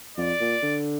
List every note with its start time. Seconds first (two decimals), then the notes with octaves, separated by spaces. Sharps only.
0.17 F2 D5
0.40 A#2
0.62 D3